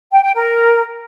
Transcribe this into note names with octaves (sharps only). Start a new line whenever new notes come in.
G5
G5
A#4